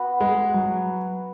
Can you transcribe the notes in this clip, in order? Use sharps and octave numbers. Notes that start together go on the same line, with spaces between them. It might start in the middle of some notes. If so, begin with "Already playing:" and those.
Already playing: B3 F#4 B4
G#3
F#3